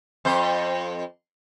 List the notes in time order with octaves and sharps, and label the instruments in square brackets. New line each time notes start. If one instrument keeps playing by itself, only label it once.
[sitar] F2 C5